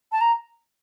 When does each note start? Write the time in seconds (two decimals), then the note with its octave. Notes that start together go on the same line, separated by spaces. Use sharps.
0.12 A5
0.21 A#5